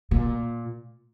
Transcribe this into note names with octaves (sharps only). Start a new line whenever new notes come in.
A#2